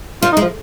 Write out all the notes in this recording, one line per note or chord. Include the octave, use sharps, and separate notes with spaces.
G3 F4
D#4
G#3
F3